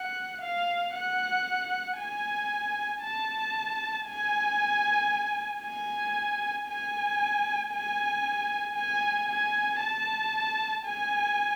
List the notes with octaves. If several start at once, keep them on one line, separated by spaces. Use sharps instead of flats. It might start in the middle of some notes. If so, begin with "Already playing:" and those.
Already playing: F#5
F5
F#5
G#5
A5
G#5
G#5
G#5
G#5
G#5
G#5
A5
G#5